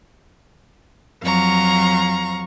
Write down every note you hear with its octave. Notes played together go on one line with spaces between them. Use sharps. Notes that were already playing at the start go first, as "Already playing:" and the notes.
F2 F#3 F5 A#5 C#6